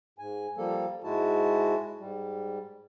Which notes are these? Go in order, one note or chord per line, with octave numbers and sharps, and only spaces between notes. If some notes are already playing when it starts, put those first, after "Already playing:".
G#2 G#5
F3 G3 A#3 A4
G#2 G#3 E4 F#4 A5
G#2 G3